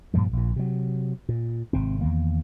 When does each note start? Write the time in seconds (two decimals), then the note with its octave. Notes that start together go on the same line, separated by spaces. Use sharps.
0.14 G2 A#2 F3 G3
0.33 A#1 A#2
0.56 C3 F#3
1.29 A#2
1.73 G#1 C3 C4
2.01 E2 D#3 A#3